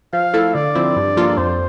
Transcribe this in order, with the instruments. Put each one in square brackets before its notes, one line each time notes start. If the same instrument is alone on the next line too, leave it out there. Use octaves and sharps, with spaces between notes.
[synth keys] F3 [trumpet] F5
[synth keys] A3 E4 A4
[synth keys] D3 [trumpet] D5
[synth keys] F3 C4 E4
G2
F3 A#3 F4 A4
[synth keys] F2 [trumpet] C5